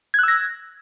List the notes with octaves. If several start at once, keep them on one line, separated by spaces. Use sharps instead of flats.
E6 F#6 G#6 A#6